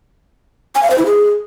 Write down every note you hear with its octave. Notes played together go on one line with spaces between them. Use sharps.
G#5
F5
C5
E4
G#4